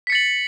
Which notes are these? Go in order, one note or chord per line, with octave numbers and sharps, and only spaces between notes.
A6 B6 C#7 F#7